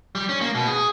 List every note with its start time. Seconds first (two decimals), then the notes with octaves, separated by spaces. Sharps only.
0.15 G3
0.29 C#4
0.41 A#3
0.55 B2
0.67 G#4